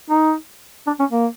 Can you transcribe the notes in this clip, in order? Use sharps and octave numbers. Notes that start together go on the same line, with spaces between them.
D#4
D4
C#4
A#3